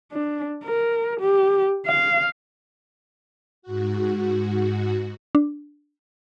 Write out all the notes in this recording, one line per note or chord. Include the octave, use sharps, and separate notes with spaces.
D4
A#4
G4
F5
G#2 F#4
D4